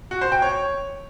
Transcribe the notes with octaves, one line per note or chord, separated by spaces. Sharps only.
F#4
C5
G5
C#5